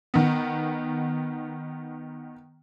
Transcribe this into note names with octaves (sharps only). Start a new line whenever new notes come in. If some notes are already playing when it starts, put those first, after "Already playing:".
D#3 B3